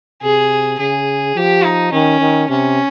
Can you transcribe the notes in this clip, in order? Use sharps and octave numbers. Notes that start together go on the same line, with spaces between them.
C3 G#4
C#3 G#4
F3 G4
D#4
D#3 C#4
D#3
C3 C#4